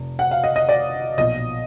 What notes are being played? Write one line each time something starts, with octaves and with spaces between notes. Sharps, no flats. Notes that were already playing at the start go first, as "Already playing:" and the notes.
Already playing: F1
F#5
F5
D#5
D#5
D5
B1 A#2 F3 D#5